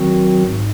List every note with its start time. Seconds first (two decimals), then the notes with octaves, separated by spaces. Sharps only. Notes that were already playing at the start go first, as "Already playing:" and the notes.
Already playing: D#3 F#3 C4 F#4
0.43 G#2